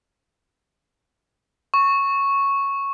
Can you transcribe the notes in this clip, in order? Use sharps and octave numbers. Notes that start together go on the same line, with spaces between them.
C#6